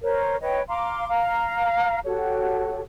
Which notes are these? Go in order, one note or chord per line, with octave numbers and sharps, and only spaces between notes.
A#4 C5 C#5
B4 C#5 D#5 G5
F5 A#5 C6 D6
F5 A#5
F#4 G4 A4 C#5